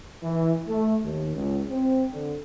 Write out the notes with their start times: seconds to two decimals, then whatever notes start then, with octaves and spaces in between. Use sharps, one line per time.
0.23 E3
0.68 A3
1.02 D#2
1.35 C#2
1.69 C4
2.11 D3